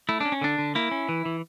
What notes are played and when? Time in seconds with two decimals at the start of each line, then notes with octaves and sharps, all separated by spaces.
0.09 A3 E4
0.20 C#4 D4
0.32 C#4
0.41 D3 D4
0.58 D3
0.75 A#3 E4
0.91 C#4
1.09 E3
1.25 E3